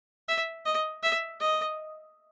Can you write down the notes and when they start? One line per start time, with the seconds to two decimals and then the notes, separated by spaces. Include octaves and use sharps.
0.28 E5
0.66 D#5
1.03 E5
1.40 D#5